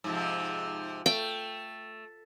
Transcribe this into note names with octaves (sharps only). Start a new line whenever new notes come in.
G#2 C3 F3
A3 G5